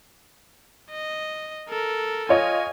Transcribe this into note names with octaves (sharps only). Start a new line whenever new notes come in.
D#5
A4 A#4
F4 C#5 D#5 G#5